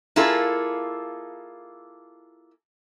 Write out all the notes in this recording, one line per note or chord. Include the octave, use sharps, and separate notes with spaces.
A#3 E4 F4 G#4 A4